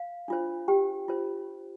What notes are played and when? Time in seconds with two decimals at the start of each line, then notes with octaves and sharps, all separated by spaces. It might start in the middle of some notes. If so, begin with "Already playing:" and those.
Already playing: F5
0.28 D4 F4 C5
0.68 G4 G5
1.08 F4 C5